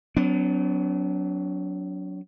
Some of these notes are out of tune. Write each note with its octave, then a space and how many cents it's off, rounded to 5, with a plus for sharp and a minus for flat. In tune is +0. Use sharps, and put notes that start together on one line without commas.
F#3 +0 B3 +45 D4 -40